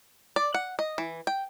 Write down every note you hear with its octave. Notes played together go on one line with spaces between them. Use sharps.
D5
F#5
D#5
E3
G5